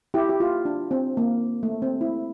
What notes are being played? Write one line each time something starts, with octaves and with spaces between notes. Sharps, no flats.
E4 G4
G4
F4
D4
C4
A#3
A3
C4
E4